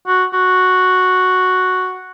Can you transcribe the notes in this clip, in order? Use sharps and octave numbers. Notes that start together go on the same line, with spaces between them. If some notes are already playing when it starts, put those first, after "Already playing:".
F#4
F#4